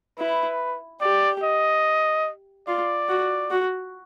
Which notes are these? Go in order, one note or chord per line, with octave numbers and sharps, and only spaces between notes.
E4 B4
G4 D5
D#5
F4 D5
F#4
F#4